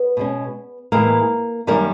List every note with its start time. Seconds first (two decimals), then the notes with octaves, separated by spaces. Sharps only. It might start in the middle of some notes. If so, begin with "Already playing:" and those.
Already playing: B3 B4
0.17 B2 G#3 C#4
0.92 A2 E3 G#3 A#3 A#4
1.67 F#2 D#3 G3 A#3 A#4